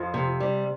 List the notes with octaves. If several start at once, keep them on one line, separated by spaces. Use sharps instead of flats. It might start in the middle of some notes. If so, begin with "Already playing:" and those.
Already playing: F2 F3
C3
G3